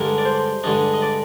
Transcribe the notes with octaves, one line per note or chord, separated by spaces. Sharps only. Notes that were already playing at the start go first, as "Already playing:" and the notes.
Already playing: G2 D3 G#3 D4 A#4
D5
C5
G2 D3 G#3 D4 D#5
D#5
D5